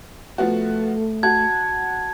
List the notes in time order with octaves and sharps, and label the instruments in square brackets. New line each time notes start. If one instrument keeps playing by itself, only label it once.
[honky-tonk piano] F3 B3 F#4 [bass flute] A3
[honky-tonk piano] F#4 [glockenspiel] A5 G#6